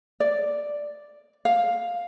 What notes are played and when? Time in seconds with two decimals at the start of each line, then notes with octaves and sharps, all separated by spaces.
0.20 D5
1.45 F5